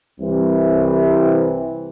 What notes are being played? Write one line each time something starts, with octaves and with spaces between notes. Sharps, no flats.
C2 C3 E3